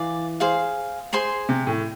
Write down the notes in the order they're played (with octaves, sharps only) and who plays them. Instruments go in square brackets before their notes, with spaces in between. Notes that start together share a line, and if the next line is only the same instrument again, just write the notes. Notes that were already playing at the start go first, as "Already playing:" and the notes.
Already playing: [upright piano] E3 [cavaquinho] D5 F5 G#5
[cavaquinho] G#4 C5 F5
G#4 C5 G#5 C6
[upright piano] C3
A2